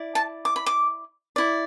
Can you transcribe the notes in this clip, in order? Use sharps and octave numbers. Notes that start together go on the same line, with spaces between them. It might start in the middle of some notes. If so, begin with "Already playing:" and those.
Already playing: E4 D5
A5
D6
B5
D6
E4 D5